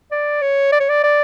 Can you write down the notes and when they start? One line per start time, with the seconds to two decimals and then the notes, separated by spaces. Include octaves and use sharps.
0.11 D5
0.42 C#5
0.72 D5
0.80 C#5
0.89 D5
1.03 D5